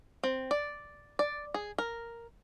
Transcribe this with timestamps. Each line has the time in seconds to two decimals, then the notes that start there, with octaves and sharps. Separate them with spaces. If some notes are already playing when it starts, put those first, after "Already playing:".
0.23 C4
0.51 D5
1.19 D5
1.54 G#4
1.78 A#4